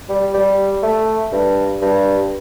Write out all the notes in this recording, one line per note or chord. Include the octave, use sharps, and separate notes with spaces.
G3
G3
A3
G2
G2